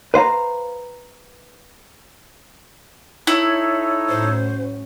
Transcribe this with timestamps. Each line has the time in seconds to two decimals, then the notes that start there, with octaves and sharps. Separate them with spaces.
0.14 B4 C5 F5 A#5
3.27 D#4 E4 A4 C#5
4.09 A2 F#3 C#4 C5